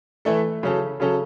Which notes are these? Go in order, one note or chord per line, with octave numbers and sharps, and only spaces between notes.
E3 A3 E4 A4
C#3 F#3 C#4 A4
C#3 F#3 C#4 A4